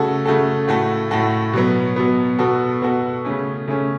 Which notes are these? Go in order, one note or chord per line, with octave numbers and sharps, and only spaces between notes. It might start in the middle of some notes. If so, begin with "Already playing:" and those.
Already playing: C#3 A3 F#4 A4
C#3 A3 F#4 A4
A2 A3 F#4 A4
A2 A3 F#4 A4
B2 F#3 B3
B2 F#3 B3
B2 B3 F#4 A4
B2 B3 F#4 A4
C#3 A3 C#4
C#3 A3 C#4